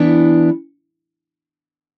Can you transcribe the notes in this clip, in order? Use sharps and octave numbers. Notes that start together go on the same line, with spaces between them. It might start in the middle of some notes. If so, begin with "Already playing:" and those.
Already playing: E3 B3 D4